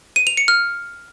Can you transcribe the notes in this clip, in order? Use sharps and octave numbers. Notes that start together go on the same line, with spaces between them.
D#7
F7
C#7
F6